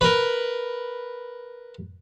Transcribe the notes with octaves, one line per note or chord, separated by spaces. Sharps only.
A#4 B4